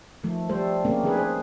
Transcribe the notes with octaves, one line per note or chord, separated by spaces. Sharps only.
D#3 F3 A3
G3 A3 A4 C5
A3 A#3 C4 C#4 G#4
D#3 G#4 B4
G#4 C5